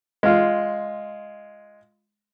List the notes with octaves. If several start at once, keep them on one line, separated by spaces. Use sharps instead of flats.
G#3 F4